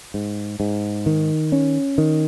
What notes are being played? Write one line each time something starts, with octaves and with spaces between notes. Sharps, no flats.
G#2
G#2
D#3
C#4
D#3